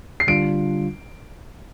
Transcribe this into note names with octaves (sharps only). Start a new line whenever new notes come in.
C7
D3 G3 D4 F4 D7